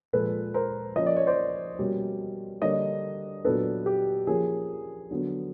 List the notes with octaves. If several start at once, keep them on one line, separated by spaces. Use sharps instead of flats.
A#2 F3 G#3 A4 B4
A#4 C5
F3 A#3 C#4 D#5
D5
C#5
C5 D5
B2 G3 A#3 C#4
D3 G3 A#3 D4 C#5 D#5
A#2 F#3 B3 D4 A4 B4
G4
F3 A#3 C#4 G#4
D3 F#3 B3